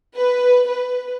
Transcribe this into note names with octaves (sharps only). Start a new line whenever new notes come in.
B4
B4